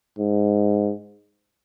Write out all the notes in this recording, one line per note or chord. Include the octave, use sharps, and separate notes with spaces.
G#2